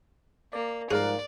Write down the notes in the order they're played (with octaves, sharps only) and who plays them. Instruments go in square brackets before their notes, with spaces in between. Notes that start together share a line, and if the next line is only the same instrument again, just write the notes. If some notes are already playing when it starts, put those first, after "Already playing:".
[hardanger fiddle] A#3 [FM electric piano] D5
[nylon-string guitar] G#2 F3 G3 [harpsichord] G#4 [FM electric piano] A#4 F5 F#6 [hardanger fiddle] D5